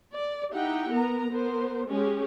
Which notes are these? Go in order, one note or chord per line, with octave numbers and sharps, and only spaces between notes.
D5
D#4 E4 G4 F#5 G5
B3 A#4 A#5
B3 A#4 C5
G#3 C#4 G4 G#4